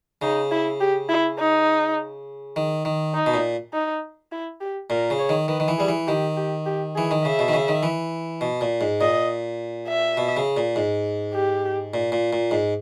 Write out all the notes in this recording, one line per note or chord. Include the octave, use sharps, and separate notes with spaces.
C#3 D#4
E4
G4
E4
D#4
D#3
D#3
D#4
B2
A#2
D#4
E4
G4
A#2 A#4
C#3
C#5
D#3
D#3 B4
D#3
E3
G3 G#4
E3
D#3 G4
G4
G4
E3 G#4
D#3
C#3 E5
B2
D#3
C#3
D#3
E3
B2
A#2
G#2
A#2 D#5
E5
B2
C#3
A#2
G#2
G4
A#2
A#2
A#2
G#2